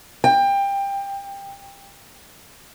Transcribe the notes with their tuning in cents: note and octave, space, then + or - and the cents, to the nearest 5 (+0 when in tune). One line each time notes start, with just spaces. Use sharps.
G5 +20